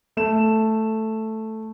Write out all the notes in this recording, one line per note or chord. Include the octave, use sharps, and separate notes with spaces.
A3 E7